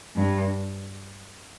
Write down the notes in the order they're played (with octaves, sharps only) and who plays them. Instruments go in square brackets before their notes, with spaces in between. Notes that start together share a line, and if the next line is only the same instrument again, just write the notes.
[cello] G2